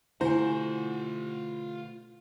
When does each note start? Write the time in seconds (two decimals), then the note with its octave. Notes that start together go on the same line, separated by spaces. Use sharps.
0.21 B2 D3 A3 E4 F4 C5 F#5 G#5